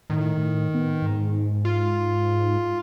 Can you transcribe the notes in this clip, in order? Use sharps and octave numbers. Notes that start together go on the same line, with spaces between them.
A2 D#3
A2
B3
G#2
F4